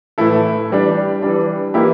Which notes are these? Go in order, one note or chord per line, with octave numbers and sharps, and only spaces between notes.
A2 E3 A3 E4 A4
E3 G3 D4
E3 G3 D4
E3 A#3 E4 G4